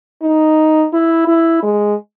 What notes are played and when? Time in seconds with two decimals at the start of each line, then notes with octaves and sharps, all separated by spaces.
0.22 D#4
0.93 E4
1.27 E4
1.63 G#3